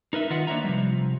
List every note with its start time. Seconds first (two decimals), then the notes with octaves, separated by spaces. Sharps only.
0.13 D#4 A#4 B4 E5
0.30 D#3 F4 D#5 E5 F#5
0.47 A#3 D4 B4 C#5 E5 A#5
0.64 C3 F3 G3